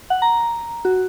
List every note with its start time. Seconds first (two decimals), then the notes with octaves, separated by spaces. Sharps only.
0.10 F#5
0.22 A#5
0.85 F#4